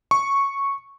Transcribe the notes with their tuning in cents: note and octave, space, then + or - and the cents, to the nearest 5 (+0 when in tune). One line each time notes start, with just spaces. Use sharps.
C#6 -5